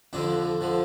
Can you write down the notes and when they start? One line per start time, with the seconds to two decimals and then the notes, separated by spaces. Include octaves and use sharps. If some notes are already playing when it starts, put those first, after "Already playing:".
0.13 F2 D3 F3 D4
0.61 D3 F3